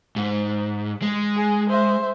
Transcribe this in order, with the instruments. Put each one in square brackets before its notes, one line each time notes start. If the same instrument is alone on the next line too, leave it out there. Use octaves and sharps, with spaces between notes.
[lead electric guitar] G#2
G#3
[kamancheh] G#4
C5 E5